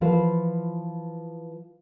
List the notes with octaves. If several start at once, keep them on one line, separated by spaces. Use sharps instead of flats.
E3 F3 F4 B4 C5